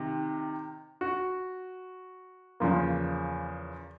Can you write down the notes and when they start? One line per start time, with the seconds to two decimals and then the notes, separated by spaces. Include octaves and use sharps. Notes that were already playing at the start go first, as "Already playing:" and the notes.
Already playing: C3 D#3
1.01 F#4
2.60 E2 C#3 F3 A#3